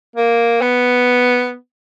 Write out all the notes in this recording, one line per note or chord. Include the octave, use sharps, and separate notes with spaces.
A#3
B3